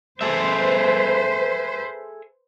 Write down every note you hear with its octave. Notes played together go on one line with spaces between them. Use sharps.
G#4 A4 B4 C5 E5